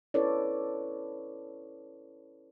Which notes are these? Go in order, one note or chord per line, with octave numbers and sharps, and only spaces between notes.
C#4 E4 A4 B4 C#5 D5